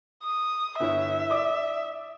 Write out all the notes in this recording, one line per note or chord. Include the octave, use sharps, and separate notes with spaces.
D#6
G1 E4 C#5 E5
D5 D6 D#6